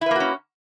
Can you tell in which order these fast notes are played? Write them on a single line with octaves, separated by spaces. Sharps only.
E4 B4 A#3 F#4 C#4